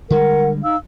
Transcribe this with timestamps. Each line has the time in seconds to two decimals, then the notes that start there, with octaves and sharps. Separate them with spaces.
0.10 D3 G3 G#3 A#4 F#5
0.63 D#4 F5 E6